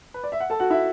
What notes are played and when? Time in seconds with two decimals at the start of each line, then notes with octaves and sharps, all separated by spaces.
0.14 B4
0.24 D5
0.32 E5
0.40 F#5
0.50 A4 A5
0.60 F#4 F#5
0.70 E4 E5